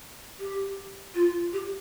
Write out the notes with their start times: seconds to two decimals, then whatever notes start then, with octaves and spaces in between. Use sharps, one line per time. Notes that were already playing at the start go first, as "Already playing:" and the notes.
0.39 G4
1.15 F4
1.53 G4